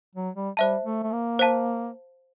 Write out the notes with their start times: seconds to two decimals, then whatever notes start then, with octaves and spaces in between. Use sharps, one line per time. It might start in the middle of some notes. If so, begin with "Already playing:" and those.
0.15 F#3
0.35 G3
0.57 G3 C5 E5 A5
0.85 A3
1.03 A3
1.12 A#3
1.39 C5 F5 A5